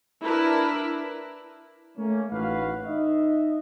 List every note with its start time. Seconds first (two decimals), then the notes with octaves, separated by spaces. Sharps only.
0.23 D4 E4 A#4 B4
1.98 A3 A#3 C#4
2.31 A1 D#4 F#4 B4 F5
2.87 D#4 D#5 E5